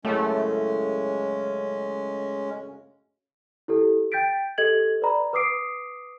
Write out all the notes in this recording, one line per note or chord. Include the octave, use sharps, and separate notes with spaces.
F#2 A2 C#3 G#3 A3 C#4
E4 G4 A4
G5 G6 A6 B6 D7
G4 A4 D#5 G#6 F#7
B4 D5 A#5 B5
B4 D6 D#6 C7 D7